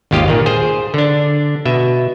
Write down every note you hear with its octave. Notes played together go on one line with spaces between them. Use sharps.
G#1 D#2 F4 G4 D#5 F5
A#2 D#3
G#4 C5
D3 D4
B2 E5